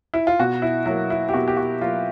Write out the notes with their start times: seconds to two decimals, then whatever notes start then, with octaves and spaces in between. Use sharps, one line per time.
0.14 E4
0.27 F4
0.39 B2 F#4
0.62 E4
0.86 F#3 A#3 E4
1.10 E4
1.29 G4
1.33 B2 F#4
1.48 G4
1.57 F#4
1.81 F#3 A#3 F4